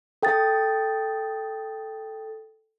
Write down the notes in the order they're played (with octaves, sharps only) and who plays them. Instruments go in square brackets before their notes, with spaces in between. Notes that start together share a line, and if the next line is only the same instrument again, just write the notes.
[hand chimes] A4 G5 D#6 A6